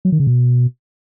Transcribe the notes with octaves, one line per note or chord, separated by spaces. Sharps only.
F#3
D#3
C#3
B2